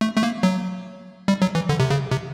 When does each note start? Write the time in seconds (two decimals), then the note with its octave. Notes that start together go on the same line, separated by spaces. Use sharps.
0.01 A3
0.17 A3
0.23 A#3
0.43 F#3
1.28 G3
1.42 F#3
1.55 E3
1.69 D3
1.80 C3
1.91 C#3
2.11 C3